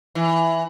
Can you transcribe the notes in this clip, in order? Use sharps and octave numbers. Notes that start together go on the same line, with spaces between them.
E3